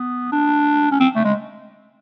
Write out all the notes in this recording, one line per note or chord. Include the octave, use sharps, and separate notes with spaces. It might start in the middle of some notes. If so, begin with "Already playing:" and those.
Already playing: B3
D4
C#4
C4
A3
G#3